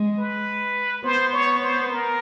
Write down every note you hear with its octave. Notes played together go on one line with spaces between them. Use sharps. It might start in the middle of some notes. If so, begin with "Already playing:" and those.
Already playing: G#3
B4
B3 C5
C#5
C5
A#4